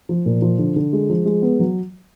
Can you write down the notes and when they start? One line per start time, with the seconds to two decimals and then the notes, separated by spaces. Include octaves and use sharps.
0.09 F3
0.26 A#2
0.42 F3
0.58 D3
0.76 D3
0.93 G#3
1.10 F3
1.26 G#3
1.42 B3
1.59 F#3